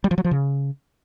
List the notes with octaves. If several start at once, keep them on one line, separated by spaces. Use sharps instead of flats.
G3
F3
F#3
F3
C#3